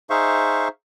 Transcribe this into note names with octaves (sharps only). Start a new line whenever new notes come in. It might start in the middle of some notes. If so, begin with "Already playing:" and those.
D#4 G#4 C5 E5 F5 C#6